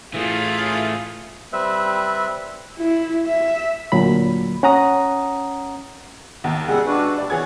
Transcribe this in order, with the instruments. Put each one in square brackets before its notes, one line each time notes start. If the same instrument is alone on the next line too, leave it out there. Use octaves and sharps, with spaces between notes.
[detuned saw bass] A2 [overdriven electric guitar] E3 A3 [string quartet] F4 [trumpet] G#4
[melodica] G3 C4 B4 E5
[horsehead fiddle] E4
E5
[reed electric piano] D2 A#2 F#3 B5
C#4 F#5 A#5 D#6
[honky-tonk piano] D#2 A5
[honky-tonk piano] C#2 E6 [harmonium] G3 G#4 F#5
[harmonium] D4 F#4 B4
[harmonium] B2 G3 [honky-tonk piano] D5
[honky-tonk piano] E3 G#6 [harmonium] G#4 C#5 F#5